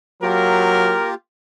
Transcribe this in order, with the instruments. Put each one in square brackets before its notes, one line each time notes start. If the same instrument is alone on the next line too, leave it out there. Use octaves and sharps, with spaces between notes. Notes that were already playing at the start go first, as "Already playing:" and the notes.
[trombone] F#3 [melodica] A#3 F4 G4 [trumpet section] A#4